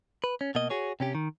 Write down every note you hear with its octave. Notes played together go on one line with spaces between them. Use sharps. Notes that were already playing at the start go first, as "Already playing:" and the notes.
B4
C#4
B2 A#3 D#5
F#4 G#4 C#5
C3 C#4 G4
D#3